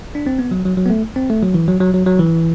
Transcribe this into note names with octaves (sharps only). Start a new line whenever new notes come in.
D4
C4
B3
F#3
F#3
F#3
B3
A3
C4
A3
F#3
E3
F#3
F#3
F#3
F#3
E3